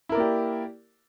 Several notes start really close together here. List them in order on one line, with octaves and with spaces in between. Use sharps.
E4 A#4 D5 A#3 G4